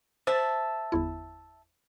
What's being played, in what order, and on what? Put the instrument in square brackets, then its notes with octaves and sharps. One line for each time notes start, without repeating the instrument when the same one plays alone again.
[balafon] C5 [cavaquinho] E5 A5
[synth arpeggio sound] G1 E2 E4